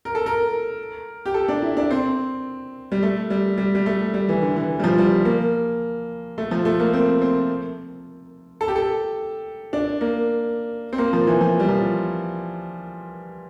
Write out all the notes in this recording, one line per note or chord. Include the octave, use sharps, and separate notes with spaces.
A#4
A4
A#4
G4
A4
D4
E4
D4
C4
G3
A3
G3
G3
G3
A3
G3
E3
D3
E3
G3
F3
G3
A#3
A3
F3
A3
A#3
C4
C4
A4
G4
A4
D4
A#3
C4
A#3
F3
E3
F3
G3
F3